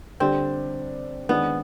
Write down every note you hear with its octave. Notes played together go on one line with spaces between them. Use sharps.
D3 G3 C4 D4 G4
D#3 G#3 B3 D4 G#4